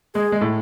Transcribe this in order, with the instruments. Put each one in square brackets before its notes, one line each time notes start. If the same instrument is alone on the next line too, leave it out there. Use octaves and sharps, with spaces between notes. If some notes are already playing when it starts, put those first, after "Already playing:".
[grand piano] G#3 [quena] G#4
[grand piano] G#3
A2